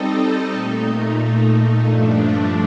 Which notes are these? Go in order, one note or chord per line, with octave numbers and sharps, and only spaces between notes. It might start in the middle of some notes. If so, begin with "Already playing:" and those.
Already playing: G3 C4 D#4 A4 D#5
A#2 A3 D#4
G2 F3 A3 D4